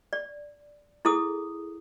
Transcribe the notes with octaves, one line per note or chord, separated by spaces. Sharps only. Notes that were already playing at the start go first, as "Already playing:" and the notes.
D5
E4 G#4 A4 D#6